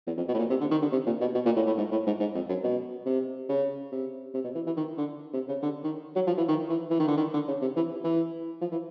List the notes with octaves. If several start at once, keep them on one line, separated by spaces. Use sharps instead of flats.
E2
F2
B2
A2
A#2
C3
D3
D#3
D3
C3
A#2
B2
B2
A#2
A2
A2
G#2
A2
G#2
G#2
F2
F#2
B2
C3
C#3
C3
C3
B2
E3
E3
D#3
D3
C3
C#3
D3
D#3
F#3
F3
E3
D#3
E3
E3
D#3
D3
D#3
D3
C#3
C3
E3
E3
F3
E3